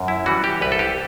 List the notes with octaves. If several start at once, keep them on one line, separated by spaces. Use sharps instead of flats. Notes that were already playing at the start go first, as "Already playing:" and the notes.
Already playing: F#2
E4
E3 G3 F#4
G4
C2 B4
A4
G4